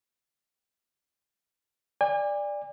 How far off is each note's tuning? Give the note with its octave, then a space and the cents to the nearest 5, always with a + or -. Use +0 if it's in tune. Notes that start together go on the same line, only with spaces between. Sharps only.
D5 +5 G#5 -40